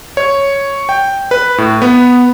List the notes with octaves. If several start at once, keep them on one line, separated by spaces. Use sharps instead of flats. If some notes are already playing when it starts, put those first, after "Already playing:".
C#5
G5
B4
A2
B3